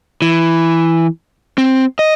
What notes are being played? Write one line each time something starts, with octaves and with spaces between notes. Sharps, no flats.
E3
C4
D#5